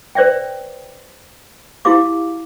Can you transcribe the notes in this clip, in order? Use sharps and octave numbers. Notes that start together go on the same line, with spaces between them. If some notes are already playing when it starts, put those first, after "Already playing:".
B4 C5 D5 E5 G5
E4 F#4 G4 F5 D6